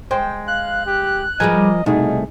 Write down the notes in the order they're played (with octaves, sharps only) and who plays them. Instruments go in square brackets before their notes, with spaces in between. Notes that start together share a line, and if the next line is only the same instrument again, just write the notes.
[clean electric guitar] G#3 [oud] C5 [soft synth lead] G5
[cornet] F5 [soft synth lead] F#6
[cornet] G4
[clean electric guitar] F3 A#4 G#5 [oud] G3 G#4 B4 [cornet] D#5
[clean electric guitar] C2 A3 [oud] B2 [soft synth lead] D#4 [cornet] G#4